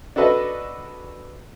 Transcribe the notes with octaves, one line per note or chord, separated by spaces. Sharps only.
D4 F#4 A4 B4 D#5